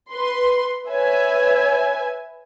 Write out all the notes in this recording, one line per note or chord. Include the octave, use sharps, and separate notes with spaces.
B4 C6
B4 C#5 E5 G#5